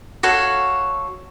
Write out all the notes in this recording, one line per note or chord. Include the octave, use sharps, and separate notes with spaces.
F#4 A4 C#5 F5